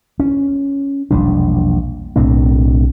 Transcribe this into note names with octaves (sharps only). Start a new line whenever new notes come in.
C#4
E1 A#1 G3 D4
B1 A2 C4 D4